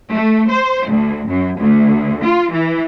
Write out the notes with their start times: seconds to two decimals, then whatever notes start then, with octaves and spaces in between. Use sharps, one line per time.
0.11 A3
0.50 C5
0.87 D2
1.28 F#2
1.60 D2
2.23 F4
2.52 E3